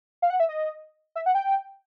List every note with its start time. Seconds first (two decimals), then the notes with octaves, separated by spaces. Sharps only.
0.22 F5
0.30 F#5
0.40 E5
0.49 D#5
1.16 E5
1.26 F#5
1.35 G5